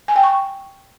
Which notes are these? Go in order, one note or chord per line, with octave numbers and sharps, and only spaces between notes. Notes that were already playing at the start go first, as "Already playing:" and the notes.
G#5
G5
C#6